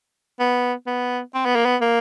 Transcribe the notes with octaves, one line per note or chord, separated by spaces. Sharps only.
B3
B3
C4
B3
A#3
B3
A#3